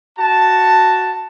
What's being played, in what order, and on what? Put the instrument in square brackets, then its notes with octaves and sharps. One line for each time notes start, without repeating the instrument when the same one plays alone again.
[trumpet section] F#4 A5